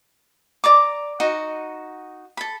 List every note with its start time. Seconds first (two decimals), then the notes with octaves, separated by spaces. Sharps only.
0.64 D5 A#5 D6
1.20 D#4 F#4 F#5
2.37 A4 B5